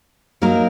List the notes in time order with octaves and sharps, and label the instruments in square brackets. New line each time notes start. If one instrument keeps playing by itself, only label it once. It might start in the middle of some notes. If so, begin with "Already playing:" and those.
[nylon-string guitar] F#3 A#3 D#4 A#4